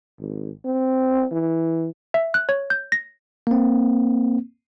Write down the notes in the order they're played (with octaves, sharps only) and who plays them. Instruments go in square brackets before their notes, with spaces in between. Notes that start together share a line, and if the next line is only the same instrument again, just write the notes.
[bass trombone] G#1
C4
E3
[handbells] E5
F#6
C#5
G6
A#6
[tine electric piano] A#3 C4